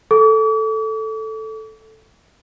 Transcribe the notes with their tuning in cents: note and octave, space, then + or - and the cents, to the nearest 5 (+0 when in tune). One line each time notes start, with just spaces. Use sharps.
A4 +0 D6 -45